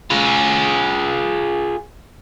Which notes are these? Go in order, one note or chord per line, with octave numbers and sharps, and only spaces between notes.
F4 G#4